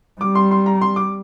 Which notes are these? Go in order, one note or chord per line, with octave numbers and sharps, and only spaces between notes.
G3 D6
C6
C6
A#5
C6
D6